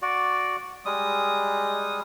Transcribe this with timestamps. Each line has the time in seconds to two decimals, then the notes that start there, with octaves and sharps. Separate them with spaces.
0.02 F#4 D5
0.85 G3 G#3 D#6